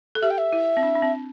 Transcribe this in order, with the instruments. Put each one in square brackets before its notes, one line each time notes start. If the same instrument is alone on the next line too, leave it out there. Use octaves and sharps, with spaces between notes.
[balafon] A4
[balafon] G4 [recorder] E5
[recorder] G5
E5
[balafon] E4
C4
D4
D4
C4